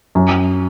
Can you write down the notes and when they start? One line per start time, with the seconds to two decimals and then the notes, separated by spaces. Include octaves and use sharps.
0.15 F#2